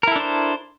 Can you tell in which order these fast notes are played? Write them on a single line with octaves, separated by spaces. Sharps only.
A#4 E4 A4 D4 C5